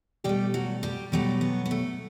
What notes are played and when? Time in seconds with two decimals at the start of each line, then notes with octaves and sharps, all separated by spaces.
0.24 B2 G3 A3 G4
0.54 F#3 F#4
0.83 G3 G4
1.12 B2 F#3 G3 A3 G4
1.41 B3
1.66 B3
1.71 A3